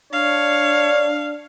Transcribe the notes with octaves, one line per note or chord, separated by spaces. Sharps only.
D4 C#5 D5 F5